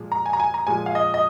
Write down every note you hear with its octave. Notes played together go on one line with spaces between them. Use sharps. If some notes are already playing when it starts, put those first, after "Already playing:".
Already playing: A#2 F3 G#3
A#5
G#5
A#5
G#5
A#5
A#2 F3 G#3 G#5
F5
D#5
D#5